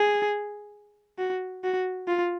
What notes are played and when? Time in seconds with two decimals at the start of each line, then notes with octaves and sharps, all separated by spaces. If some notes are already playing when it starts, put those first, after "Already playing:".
Already playing: G#4
1.19 F#4
1.64 F#4
2.08 F4